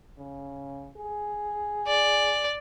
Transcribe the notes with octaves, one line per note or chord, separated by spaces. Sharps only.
C#3
G#4
D5